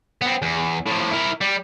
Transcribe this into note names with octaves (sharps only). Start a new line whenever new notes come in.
B3 C4
E2
A2 F3
E4 A#4
G3